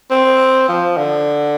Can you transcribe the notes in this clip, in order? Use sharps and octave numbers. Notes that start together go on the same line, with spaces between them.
C4
F3
D3